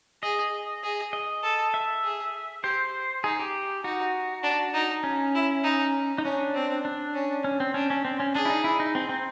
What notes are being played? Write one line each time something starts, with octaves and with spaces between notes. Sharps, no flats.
G#4 D#5
G#4
D#5
A4
E5
G#4
G4 C5
D#4 G#4
G4
D#4 F#4
D4
D#4
C#4
E4
D#4
D#4
C#4 D4
C4
D4
C#4
C#4
C4
C#4 D4
C#4
C4
C#4
D4 G#4
E4
D#4
E4
D#4
C4
C4